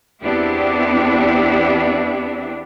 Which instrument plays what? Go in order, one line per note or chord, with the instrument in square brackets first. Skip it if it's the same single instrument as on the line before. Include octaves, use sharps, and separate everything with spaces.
[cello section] E2 B3 C4 D4 E4 G4